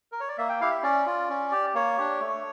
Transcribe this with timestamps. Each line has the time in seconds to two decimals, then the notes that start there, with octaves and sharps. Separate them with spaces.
0.12 A#4
0.20 C#5
0.29 D5
0.38 A#3 E5
0.49 G5
0.61 E4 G4 F5
0.71 E5
0.83 C#4 D5
1.06 F4
1.29 C#4
1.52 G4
1.75 A#3 C#5
1.97 D4 G4
2.20 A3